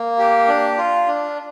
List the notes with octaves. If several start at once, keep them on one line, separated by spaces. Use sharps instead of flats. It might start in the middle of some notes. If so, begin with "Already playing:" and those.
Already playing: A#3
G4
D4
F4
D4